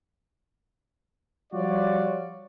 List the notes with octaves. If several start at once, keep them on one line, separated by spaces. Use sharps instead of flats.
F3 G3 F4 F#4 C#5 D5